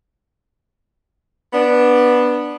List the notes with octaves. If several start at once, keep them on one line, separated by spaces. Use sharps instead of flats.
B3 D4